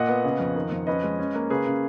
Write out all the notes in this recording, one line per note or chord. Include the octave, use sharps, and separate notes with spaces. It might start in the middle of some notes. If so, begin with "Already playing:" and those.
Already playing: A#2 D#5 F#5
B3
C#3
F2
D#3
F2
C#4 B4 D#5
G#3
C#4
A#3
C#3 G#4 B4
C#3